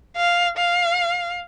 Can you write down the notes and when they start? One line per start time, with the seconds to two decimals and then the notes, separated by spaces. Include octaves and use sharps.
0.17 F5
0.58 F5